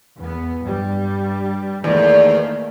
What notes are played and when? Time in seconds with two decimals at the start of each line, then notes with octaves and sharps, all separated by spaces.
0.17 E2 B3
0.60 G2 G3
1.84 E2 D#3 A3 A#3